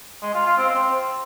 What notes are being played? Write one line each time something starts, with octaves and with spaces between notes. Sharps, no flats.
G#3
F4
F4
C4
C4